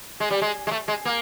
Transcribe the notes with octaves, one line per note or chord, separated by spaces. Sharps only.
G#3
G3
G#3
G#3
A3
G#3
A#3